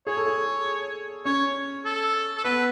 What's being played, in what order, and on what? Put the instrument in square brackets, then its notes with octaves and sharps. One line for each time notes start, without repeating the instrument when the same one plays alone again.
[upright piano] G#4 [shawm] C#5
[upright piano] A4
G#4
[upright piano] C#4 [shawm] C#5
[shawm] A4
A4
[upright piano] B3 [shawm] B4